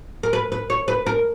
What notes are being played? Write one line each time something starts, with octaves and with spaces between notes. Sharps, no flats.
A#4
B4
B4
C#5
B4
A#4